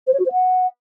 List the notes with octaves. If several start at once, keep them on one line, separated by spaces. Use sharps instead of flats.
C5
C#5
F#4
C5
F#5